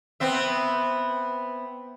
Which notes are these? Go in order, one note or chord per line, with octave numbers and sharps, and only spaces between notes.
B3 C4 E5